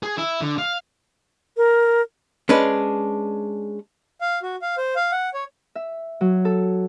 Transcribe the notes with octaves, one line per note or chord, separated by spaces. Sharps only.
G#4
E4
D3
F5
A#4
G#3 C#4 D4 B4
F5
F#4
F5
C5
F5
F#5
C#5
E5
F#3
A4